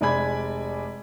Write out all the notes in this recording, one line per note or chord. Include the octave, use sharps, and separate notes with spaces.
F1 G#3 D5 G#5 B5 G#6